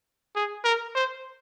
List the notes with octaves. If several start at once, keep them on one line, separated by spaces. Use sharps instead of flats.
G#4
A#4
C5